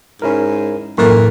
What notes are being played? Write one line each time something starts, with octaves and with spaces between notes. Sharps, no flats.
G#2 C#4 E4 A#4
B1 F#2 A2 E3 A#3 A4